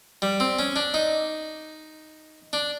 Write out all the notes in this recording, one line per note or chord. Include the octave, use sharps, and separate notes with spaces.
G3
C4
C#4
D4
D#4
D4